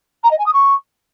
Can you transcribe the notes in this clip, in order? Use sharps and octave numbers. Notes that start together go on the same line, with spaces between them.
A#5
D#5
G#5
D#6
C#6